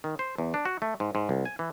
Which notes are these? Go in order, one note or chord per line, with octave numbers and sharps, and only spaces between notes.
D#3
C5
E2
D4
F#4
A3
G#2
G#2
C2
G#5
E3